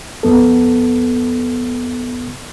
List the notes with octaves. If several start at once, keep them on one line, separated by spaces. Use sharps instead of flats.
F2 B3 A4